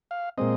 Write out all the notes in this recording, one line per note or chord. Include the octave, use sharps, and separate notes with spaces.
F5
A#2 G#3 C4 D#5